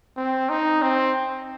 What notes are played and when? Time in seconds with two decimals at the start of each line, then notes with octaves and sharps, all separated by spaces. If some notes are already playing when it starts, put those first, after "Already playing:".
0.17 C4
0.49 D#4
0.82 C4